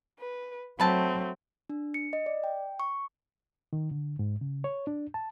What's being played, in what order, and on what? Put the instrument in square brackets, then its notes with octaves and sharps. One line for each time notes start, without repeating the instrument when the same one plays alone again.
[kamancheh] B4
[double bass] F#3 [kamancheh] A3 C4 [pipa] B4 A5
[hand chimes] D4
C#7
D#5
D5
G5
C#6
[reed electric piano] D#3
D3
G#2
C#3
C#5
D4
A5